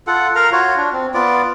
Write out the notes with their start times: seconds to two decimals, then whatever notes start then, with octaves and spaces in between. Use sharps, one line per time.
0.07 F4 A4 F#5
0.35 A#4 F5 A#5
0.52 F4 F#4 C#5
0.77 D4
0.93 C4
1.14 B3 F4 D5 D6